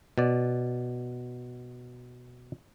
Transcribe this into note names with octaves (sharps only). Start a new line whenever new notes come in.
B2 D5